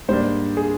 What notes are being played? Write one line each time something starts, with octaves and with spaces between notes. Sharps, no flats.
G#2 G3 A#3 D4 C5
G#4